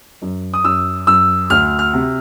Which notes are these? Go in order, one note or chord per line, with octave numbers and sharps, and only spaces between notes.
F#2
D#6
F#2 E6
F#2 E6
D2 F6
F6
C3